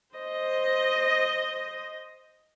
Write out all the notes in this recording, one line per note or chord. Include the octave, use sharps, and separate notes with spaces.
C5 D#5